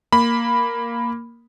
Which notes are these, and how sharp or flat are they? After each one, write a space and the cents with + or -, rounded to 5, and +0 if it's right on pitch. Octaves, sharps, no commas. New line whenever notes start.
A#3 +0 B5 +0